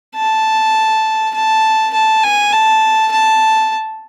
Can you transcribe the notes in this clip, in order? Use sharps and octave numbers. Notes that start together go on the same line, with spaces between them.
A5
A5
A5
G#5
A5
A5